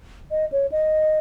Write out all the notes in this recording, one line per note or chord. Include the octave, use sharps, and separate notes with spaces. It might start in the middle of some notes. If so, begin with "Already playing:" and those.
D#5
C#5
D#5